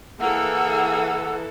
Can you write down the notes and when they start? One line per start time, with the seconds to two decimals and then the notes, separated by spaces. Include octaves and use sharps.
0.20 E3 A#3 G#4 A4 F#5 E6